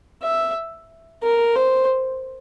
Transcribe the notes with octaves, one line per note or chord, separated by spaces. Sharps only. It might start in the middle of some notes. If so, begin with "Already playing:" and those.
E5
A#4
C5